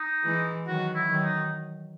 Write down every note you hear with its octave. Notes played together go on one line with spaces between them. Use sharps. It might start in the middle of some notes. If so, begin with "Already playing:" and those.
Already playing: D#4
E3 G#3
D#3 F#3 F#4
E4
D#3 F#3
D#4